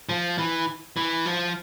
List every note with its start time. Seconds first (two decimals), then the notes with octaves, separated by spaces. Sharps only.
0.09 F3
0.38 E3
0.97 E3
1.26 F3